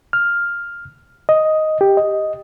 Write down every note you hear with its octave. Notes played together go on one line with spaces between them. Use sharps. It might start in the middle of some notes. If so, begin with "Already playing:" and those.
F6
D#5
G4
D#5